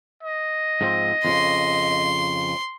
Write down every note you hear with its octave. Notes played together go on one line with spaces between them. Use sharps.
D#5
G#2 F3 C4
F2 A2 C#3 C6